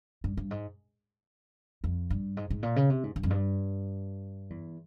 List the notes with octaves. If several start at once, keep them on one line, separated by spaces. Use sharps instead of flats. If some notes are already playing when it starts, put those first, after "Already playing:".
G2
G2
G#2
F2
G2
G#2
G#2
A#2
C#3
C3
G#2
G2
F2
G2
E2